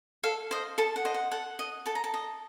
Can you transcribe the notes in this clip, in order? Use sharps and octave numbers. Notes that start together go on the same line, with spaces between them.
A4 F5
C5 D#5
A4 A5
F#5
C5 D#5
F#5
A4 F#5
D#5
A4 A5
A#5
A5
D#5